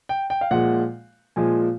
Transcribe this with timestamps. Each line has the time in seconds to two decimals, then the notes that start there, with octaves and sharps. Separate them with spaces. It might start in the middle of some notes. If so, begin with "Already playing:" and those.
0.09 G5
0.30 G5
0.41 F5
0.51 A#2 F3 G#3 F#5
1.36 A#2 F3 G#3 G#5